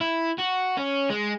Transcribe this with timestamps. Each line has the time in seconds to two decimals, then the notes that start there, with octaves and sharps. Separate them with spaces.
0.01 E4
0.38 F#4
0.77 C#4
1.10 G#3